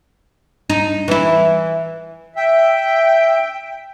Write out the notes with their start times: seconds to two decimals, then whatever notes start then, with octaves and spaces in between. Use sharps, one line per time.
0.70 D#4
1.08 E3 E4
2.36 E5 G5